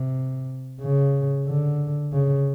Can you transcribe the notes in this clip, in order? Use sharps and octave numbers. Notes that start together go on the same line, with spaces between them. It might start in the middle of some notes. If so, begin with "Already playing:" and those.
Already playing: C3
C#3
D3
C#3